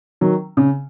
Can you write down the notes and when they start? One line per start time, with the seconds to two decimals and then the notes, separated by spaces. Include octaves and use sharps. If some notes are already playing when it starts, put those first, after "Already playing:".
0.21 D#3 F#3
0.57 C#3